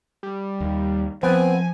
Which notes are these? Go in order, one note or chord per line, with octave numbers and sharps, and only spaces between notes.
G3
D#2
F3 B3 C4 G#5